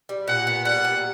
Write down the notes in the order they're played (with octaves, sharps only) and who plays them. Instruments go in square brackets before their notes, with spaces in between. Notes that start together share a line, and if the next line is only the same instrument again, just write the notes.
[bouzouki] G3
[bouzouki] A#2 [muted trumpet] F#5
[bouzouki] B3
[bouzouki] G3 [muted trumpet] F#5
[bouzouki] A#2